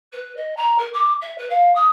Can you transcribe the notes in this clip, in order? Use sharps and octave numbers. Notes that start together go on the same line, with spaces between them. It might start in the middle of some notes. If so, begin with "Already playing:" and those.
B4
D#5
A#5
A#4
D6
E5
B4
F5
D#6